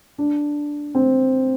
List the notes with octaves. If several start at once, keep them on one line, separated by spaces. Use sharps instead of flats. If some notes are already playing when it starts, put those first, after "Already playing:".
D4
C4